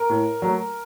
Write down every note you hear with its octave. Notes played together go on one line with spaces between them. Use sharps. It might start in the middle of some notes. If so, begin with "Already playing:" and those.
Already playing: A#4
A2
F#3 A3